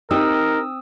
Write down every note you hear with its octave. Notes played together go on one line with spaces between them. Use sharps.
C4 D#4 G4 A#4 D#6 E6